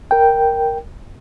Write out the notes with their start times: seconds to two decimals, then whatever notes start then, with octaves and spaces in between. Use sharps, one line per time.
0.11 A#4 G5